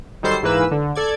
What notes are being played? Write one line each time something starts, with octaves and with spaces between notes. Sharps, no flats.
D#3 F#3 G3 A4 C5 C7
G#2 E3 A#3 B4 E6
D3
A4 D5 G#6